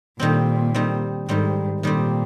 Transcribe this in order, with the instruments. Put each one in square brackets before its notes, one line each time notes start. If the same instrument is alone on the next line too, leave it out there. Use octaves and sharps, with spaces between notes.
[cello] A#2 [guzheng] D#3 G3 C4
[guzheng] D#3 G3 C4
[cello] G#2 [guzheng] D#3 G3 C4
[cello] A#2 [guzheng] D#3 G3 C4